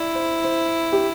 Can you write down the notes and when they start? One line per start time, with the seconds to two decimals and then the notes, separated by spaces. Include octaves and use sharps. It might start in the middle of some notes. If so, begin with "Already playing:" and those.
Already playing: E4 D5
0.15 C5
0.44 C5
0.92 G4